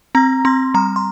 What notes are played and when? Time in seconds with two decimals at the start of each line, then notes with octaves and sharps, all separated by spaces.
0.15 C4 A#5
0.45 C4 C6
0.74 G3 A#5
0.96 C6